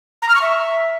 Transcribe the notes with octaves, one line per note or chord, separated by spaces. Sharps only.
A#5
F6
C#6
E5